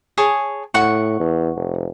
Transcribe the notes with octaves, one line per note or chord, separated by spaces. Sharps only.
G#4 C#5 A5
A2 F#5 C#6
E2
F1